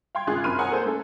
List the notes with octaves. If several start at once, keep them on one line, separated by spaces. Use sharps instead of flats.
F5 G5 C6 G#6
G#1 C#3 F4 G#4 F#6
F#2 C4 B5 C6 F6 D#7
C#5 F#5 G#5 A#5 D#6
A#3 G#4 A4 C5
A3 C#4 A4